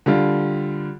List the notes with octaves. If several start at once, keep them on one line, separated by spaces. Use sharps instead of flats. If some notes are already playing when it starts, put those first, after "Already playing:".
D3 G3 F4